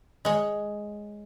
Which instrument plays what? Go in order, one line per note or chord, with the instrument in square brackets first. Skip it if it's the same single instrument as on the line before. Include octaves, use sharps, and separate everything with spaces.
[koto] G#3 C#5